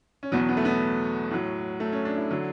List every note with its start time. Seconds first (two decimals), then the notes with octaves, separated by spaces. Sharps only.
0.23 C#4
0.32 E2 B2 F#3 B3
0.49 B3
0.57 A3
0.65 B3
1.31 A2 F#3
1.80 A3
1.92 C#4
2.05 D4
2.18 E4
2.30 D3 F#3